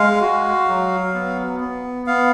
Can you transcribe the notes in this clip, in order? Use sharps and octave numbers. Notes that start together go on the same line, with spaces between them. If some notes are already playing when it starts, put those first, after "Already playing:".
Already playing: G#3 F5
F#4
F#3
B3
B3
B3 F5